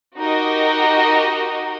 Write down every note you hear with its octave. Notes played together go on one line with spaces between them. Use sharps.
D#4 F#4 G4 A#4 D#5